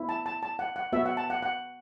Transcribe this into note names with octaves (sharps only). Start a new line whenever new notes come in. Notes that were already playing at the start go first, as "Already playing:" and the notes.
Already playing: B3 E4
A5
A5
A5
F#5
F#5
B3 F#4 E5
F#5
A5
F#5
F#5